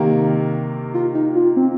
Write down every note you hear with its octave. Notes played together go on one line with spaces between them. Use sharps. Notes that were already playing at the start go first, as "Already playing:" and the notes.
Already playing: C3 D#3 A#3
F4
D#4
F4
C4